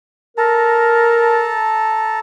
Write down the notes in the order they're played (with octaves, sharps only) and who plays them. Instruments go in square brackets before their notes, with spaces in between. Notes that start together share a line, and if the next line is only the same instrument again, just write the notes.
[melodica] A4 A5 A#5 [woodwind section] A#4